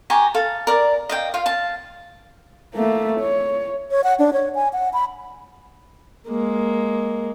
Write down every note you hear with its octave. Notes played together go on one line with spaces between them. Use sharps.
G4 G#5 A#5 C#6
A4 F5
A#4 D5
D#5 F5 G5
F4 F5
F5 A5
A3 A#3
C#5
C#5
F#5
D4
C#5
G#5
F#5
B5
G#3 A#3